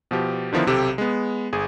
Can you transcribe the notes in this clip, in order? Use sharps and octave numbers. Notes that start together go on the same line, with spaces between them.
B2 F3 G4
D3 D#3 F3 B3 E4
B1 C3 G4 A4
G#3 B3
G1 G#4